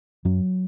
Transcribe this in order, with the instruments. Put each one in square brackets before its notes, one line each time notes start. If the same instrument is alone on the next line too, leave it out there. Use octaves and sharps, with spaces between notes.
[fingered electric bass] F#2 F#3